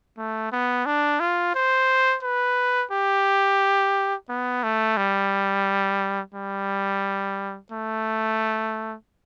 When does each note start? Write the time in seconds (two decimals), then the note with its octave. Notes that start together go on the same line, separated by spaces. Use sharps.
0.18 A3
0.52 B3
0.86 D4
1.20 F4
1.55 C5
2.23 B4
2.91 G4
4.29 B3
4.63 A3
4.97 G3
6.35 G3
7.72 A3